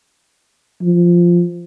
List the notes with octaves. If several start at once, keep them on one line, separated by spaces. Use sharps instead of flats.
F3